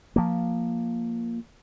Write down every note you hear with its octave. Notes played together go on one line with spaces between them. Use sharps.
F3 A#3